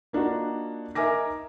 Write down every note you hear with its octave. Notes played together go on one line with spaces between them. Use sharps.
A#3 D4 D#4 F4 F#4
D#4 A#4 E5 G#5 D6 A#6